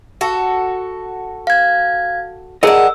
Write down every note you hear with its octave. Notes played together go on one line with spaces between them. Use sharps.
F#4 A4
F5 G#6
D4 G#4 A#4 D#5 F#5 E6